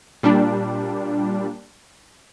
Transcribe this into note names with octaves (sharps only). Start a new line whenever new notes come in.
A#2 G3 D4